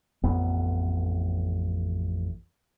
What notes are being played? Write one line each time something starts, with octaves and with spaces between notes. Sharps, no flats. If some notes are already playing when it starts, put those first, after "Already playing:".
A1 F2 B3